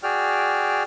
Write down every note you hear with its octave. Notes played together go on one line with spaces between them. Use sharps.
F#4 G#4 D5 G5 F6